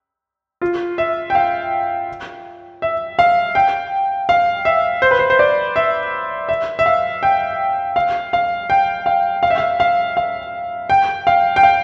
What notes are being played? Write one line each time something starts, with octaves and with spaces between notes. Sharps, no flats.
F4
E5
G5
F5
E5
F5
G5
F5
E5
C5
B4
C5
C5
D5
E5
E5
E5
F5
G5
F5
F5
G5
F5
F5
E5
F5
F5
F5
G5
F5
G5
F5